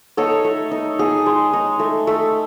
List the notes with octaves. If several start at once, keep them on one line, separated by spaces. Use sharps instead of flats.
D#4 A4 C#5
A3
D#4
D#4 G#4
G#3
D#4
A3
A3